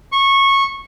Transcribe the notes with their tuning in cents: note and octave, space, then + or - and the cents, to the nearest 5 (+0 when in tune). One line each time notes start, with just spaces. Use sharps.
C#6 -15